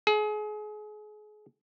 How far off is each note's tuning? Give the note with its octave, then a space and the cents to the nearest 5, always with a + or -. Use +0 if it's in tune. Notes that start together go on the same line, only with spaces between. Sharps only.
G#4 +35